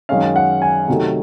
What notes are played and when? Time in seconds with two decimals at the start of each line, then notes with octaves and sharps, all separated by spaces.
0.09 F#2 D#3 G#3 C#4 F5
0.36 F#5
0.62 G#5
0.88 C3 D#3 F#3 A3